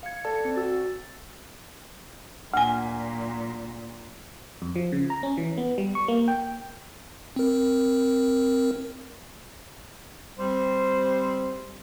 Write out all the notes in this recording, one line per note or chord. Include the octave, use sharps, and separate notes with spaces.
F5 G#6 C#7
A4 D5 A5
C4
F#4 E6 A6
D2 A#2 F#3 G#5
F2
F3
C#3
A#5
C#4
E3
B3
G3
C#6
A#3
G5
C4 A#4
G3 C4 C5